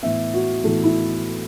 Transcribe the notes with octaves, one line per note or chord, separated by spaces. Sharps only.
A2 E3 B3 E5
F#4
A2 E3 B3 A4
E4